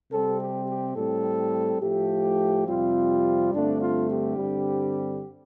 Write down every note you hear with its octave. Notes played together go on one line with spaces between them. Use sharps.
C3 G3 C4 A4
G4
G4
A2 G3 C4 A4
A2 F3 A3 G4
F2 C3 G3 C4 F4
G2 D3 A3 C4 D4
F4
G4
G2 D3 G3 C4